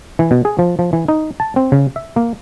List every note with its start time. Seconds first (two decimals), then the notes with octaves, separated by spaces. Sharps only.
0.19 E3
0.31 B2
0.45 G#4
0.59 F3
0.79 F3
0.93 E3
1.08 D#4
1.40 A5
1.56 C4
1.72 C#3
1.96 E5
2.16 A#3